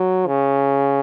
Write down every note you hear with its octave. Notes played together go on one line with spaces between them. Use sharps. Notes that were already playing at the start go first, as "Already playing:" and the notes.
Already playing: F#3
C#3